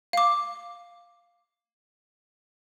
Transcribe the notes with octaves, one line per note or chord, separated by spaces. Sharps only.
F5 D6